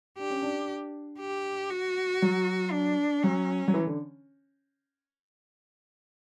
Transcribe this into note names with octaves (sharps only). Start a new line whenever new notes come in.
D4 G4
C#4
D4
G4
F#4
F#3
D4
F#3 C#4
F#3
E3
D3